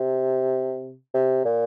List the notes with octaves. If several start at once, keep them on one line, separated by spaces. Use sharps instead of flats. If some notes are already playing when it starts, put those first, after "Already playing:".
Already playing: C3
C3
A#2